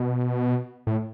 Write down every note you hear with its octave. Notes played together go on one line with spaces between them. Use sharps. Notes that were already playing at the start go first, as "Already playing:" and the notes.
Already playing: B2
A2